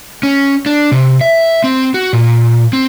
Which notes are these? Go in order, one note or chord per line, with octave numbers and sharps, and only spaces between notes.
C#4
D4
C3
E5
C4
F#4
A#2
C4